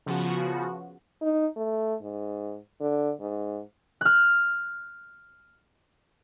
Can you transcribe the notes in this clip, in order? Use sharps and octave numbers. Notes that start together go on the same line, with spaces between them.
C#3 F3 B3 F#4
D#4
A3
G#2
D3
G#2
F6 F#6